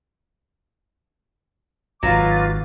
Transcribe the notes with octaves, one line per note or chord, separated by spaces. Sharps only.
G#1 F#3 F4 B4 D6